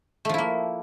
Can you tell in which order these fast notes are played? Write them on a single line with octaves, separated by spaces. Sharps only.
A3 F3 E4 A#3